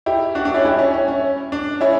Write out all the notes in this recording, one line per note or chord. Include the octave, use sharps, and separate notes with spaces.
E4 G4
D4 F#4
D4
C#4 E4
E4 G4
C#4 E4
C#4
C#4
D4
C#4 E4